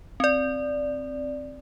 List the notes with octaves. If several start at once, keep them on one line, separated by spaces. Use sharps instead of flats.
C4 D5